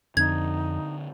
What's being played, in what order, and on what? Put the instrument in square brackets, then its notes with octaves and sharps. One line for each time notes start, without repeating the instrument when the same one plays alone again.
[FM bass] F2 [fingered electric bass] D3 C4 [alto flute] D#4 [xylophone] G#6